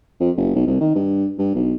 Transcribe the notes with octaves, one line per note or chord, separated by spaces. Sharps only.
F2
F#1
B1
C2
D#3
G2
G2
B1